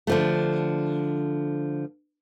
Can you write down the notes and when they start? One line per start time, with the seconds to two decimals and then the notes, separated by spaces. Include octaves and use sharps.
0.07 D3 F3 A3